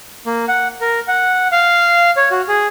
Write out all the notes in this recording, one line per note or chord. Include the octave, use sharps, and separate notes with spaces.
A#3
F#5
A#4
F#5
F5
C#5
F#4
G#4